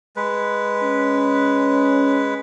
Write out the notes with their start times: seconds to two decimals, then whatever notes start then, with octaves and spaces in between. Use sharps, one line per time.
0.16 G#3 B4
0.82 C#4